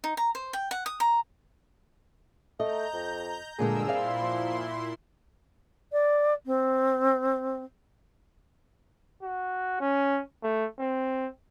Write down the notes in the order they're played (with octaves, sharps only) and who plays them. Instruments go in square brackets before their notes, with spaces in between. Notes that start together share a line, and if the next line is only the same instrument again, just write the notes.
[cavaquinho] D#4
A#5
C5
G5
F#5
D#6
A#5
[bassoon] A3 [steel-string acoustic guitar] D#5 [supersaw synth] A#5 G6
[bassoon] F2
[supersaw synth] G2 A#4 E6 [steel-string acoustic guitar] A#2 D3 G#3 [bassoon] G#4
[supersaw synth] A#2 E4 C6 [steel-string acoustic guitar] C4 D5 F5
[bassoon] F3
[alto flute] D5
C4
[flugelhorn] F#4
C#4
A3
C4